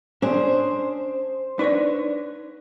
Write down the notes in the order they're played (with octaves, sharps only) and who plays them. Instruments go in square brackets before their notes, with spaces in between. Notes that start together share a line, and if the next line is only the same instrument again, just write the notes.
[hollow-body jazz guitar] C#4 D4 G#4 [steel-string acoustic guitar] C5
[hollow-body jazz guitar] D4 B4 C#5 [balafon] D#4 D5